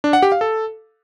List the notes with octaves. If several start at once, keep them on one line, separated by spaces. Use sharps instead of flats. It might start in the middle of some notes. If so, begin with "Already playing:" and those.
D4
F#5
G4
F5
A4